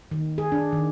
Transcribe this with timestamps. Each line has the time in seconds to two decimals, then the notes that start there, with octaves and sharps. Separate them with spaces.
0.11 D#3
0.38 G#4
0.52 D4
0.73 D#3